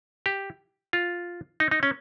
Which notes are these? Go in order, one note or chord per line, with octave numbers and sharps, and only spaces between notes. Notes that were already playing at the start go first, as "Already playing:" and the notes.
G4
F4
D#4
D#4
C#4